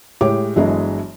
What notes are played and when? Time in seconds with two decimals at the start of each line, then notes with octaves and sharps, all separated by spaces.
0.21 A2 G#3 G4 C#5 D6
0.56 G1 E3 F#3 G#3 D4 D#5